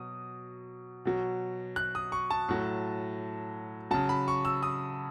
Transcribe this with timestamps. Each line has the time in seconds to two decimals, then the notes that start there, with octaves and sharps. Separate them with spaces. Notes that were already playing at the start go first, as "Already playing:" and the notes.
Already playing: B2 F#3 D#6
1.05 B2 F#3
1.76 F#6
1.95 D#6
2.12 C#6
2.30 A5
2.49 A2 F#3
3.91 C#3 F#3 A5
4.09 B5
4.28 C#6
4.45 E6
4.63 D#6